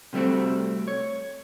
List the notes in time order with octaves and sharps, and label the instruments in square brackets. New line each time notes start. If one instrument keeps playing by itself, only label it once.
[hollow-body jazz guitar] C3 G3 A3 C4 F#4
C#5